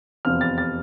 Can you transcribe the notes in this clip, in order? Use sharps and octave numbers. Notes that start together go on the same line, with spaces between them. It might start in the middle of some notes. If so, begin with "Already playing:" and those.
F1 E2 C3 F3 C4 F6
A6
A6